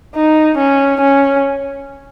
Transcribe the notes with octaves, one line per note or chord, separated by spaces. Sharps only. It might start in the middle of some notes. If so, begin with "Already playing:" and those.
D#4
C#4
C#4